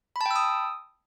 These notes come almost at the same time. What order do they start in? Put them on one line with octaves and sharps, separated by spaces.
B5 A5 G5 E6 D#6